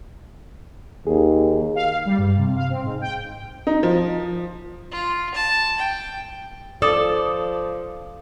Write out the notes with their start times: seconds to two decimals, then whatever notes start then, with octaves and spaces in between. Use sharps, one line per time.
1.07 D#2 G#4
1.75 F5
2.06 G3
2.18 G2
2.37 C3
2.56 F5
2.69 C4
2.83 G#2
3.01 G5
3.67 D#4
3.83 F3
4.91 F4
5.35 A5
5.79 G5
6.82 F3 A4 D5 D6 D#6 E7